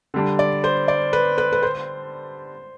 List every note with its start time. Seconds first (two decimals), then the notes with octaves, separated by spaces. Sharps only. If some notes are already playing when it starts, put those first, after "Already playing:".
0.14 D3 G3 D4
0.39 D5
0.64 C5
0.88 D5
1.13 B4
1.38 B4
1.53 B4
1.63 C5